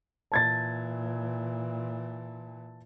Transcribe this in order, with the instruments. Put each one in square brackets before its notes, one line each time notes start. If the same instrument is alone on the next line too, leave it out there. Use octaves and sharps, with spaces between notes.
[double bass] A#2 E3 [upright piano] A5 G#6 A6